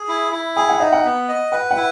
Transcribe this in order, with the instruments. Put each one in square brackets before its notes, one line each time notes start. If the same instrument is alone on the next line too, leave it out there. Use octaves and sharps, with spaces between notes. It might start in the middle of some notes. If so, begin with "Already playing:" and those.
Already playing: [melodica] G#4
E4
E4
[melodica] G#4 [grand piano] G#5
[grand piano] F#5
[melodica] D#4 [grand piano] E5
[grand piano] F#5
[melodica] B3
D#5
[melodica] B4 [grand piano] F#5
[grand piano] F#5
[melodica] E4